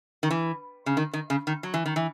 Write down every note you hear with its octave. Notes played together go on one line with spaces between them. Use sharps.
D#3
E3
C#3
D#3
D#3
C#3
D#3
F#3
E3
D#3
E3